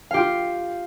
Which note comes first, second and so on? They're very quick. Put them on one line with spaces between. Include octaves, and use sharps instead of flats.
F5 G4 F4